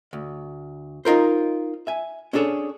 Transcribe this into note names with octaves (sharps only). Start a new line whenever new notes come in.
D2
D#4 F4 A#4 C5
E5 G#5
C#4 D4 G#4 A4 C#5